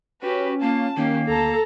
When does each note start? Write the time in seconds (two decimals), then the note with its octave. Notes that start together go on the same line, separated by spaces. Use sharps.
0.22 C#4 F#4 G4 B4
0.61 A#3 F4 A5
0.97 D#3 A#3 C#4 G4
1.28 D2 A4 A5 A#5